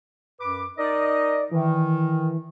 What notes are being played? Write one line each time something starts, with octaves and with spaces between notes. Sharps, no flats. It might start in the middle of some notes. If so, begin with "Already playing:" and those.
F#2 B4 D6
D#4 A#4 D5 D#5
D#3 E3